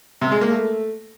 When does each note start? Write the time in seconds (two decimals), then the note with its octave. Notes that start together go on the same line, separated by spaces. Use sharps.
0.21 C3
0.31 G#3
0.41 A#3
0.51 A3